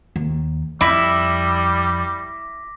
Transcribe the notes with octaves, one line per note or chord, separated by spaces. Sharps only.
D#2
F2 G3 E4 D6 A#6 B6